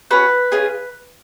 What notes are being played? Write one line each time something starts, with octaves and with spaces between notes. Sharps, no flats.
C#4 F#4 B4
C#4 F4 G#4